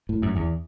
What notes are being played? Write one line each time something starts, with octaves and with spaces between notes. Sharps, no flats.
A2
F#2
E2